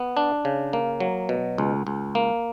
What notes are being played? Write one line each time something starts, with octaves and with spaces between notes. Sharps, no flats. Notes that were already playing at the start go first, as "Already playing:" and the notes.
Already playing: B3
D4
C#3
A#3
F#3
B2
C#2
C#2
A#3